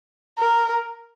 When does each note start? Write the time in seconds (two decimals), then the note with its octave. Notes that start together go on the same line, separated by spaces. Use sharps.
0.39 A#4